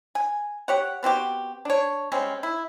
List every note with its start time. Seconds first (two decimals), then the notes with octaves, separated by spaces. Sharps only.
0.15 G#5
0.68 G4 C#5 F#5
1.03 B3 C4 F#4 G4
1.65 D4 C#5
2.12 G3 G#3 C4 C#4
2.43 E4